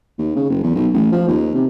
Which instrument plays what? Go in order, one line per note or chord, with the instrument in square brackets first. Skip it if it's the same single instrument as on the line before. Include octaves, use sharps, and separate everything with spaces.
[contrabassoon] D#2
C#3
F#1
E2
B1
A1
F3
D#2
C3